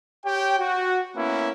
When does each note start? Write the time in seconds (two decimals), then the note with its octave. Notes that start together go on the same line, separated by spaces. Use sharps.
0.25 G4 C#5 G5
0.58 F#4
1.15 A#3 B3 C#4 E4